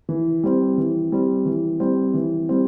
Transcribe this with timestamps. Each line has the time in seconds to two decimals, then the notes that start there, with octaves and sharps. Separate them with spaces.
0.09 E3
0.44 G3 C4
0.78 E3
1.12 G3 C4
1.46 E3
1.80 G3 C4
2.14 E3
2.49 G3 C4